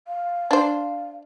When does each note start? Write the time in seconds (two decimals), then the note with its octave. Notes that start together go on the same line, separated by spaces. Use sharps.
0.08 F5
0.51 D4 C5